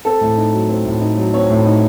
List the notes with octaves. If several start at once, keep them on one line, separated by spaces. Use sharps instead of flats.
C4 A4
A2
D#4
F#3
C4
A2
D#4
F#3
C4 C#5
A2
D#4